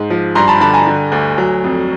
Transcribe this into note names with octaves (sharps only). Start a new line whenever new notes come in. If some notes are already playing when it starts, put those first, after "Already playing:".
Already playing: G#2
F3
G2 A#5 C6
A5 B5
D3 A5 B5
G#5 A#5
D3
D2
F#3
F2